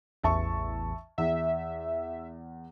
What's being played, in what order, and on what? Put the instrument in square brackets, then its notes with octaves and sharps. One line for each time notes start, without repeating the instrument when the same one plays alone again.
[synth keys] A1 E2 [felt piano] E5 A5 C#6
[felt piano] E2 [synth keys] E5